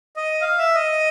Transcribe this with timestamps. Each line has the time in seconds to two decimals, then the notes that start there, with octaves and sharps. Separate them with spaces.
0.16 D#5
0.41 F5
0.58 E5
0.75 D#5